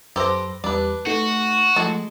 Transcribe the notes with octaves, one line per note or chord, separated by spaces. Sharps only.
F#2 G4 A4 B4 C5 A#6
E2 G3 D4 B4
A3 D#4 F#4
F3 G#3 A3 A5